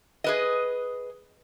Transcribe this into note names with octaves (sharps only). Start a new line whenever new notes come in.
G#4 B4 D#5